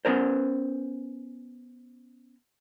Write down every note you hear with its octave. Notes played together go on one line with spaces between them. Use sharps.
B3 C#4 A#4 C5